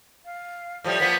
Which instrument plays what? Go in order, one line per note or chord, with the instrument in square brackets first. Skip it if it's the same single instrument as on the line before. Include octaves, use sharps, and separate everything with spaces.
[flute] F5
[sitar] A2 F3 G3
[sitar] F3 A#3 B3 [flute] B6